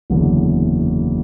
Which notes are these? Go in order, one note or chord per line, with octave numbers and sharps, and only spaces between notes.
F#1 E2 D3